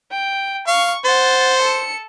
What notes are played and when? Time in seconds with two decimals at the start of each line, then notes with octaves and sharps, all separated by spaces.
0.12 G5
0.67 F5 C#6
1.05 C5 F#5 A6
1.59 A4 C#7